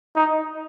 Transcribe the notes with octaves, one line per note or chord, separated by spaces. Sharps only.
D#4